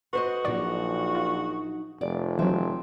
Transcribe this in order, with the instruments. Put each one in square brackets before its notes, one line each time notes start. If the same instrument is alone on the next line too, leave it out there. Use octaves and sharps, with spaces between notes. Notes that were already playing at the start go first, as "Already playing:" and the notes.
[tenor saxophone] F#4 [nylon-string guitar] B4 C5 D#5
[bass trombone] A#1 [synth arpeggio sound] A#2 D5 [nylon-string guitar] F#3 D#4
[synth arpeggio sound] F4
[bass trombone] F1 [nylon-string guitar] D5
[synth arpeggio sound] E3 F#3 [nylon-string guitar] C4